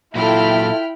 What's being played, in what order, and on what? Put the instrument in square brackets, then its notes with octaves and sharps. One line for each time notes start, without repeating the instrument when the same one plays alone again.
[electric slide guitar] A#2 F#3 [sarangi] E4 [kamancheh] F4 A4 [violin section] G5 B5 F6